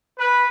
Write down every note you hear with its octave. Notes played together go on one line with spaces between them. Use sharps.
B4